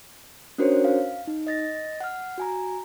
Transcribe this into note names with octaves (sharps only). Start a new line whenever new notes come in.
C#4 D4 F#4 A#4 C5 C#5
F5
D#4
D#5 A6 A#6
F#5 F6
F#4 G#5 A#5